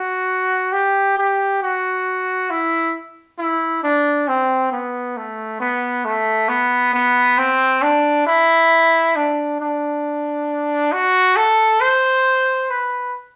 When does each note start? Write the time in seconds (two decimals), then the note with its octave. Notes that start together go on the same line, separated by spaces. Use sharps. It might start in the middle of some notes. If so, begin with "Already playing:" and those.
Already playing: F#4
0.72 G4
1.17 G4
1.62 F#4
2.50 E4
3.38 E4
3.83 D4
4.28 C4
4.72 B3
5.17 A3
5.60 B3
6.05 A3
6.48 B3
6.93 B3
7.38 C4
7.82 D4
8.26 E4
9.16 D4
9.60 D4
10.92 F#4
11.36 A4
11.80 C5
12.70 B4